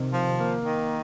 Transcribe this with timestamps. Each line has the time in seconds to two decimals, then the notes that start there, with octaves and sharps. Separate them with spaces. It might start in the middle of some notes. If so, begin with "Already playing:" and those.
Already playing: C3 D#3
0.11 F3
0.38 A#3
0.64 D#3